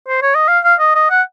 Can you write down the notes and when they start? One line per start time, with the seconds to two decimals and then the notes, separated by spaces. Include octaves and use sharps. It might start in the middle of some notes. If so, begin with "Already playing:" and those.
0.08 C5
0.22 C#5
0.35 D#5
0.48 F5
0.64 F5
0.80 D#5
0.95 D#5
1.11 F#5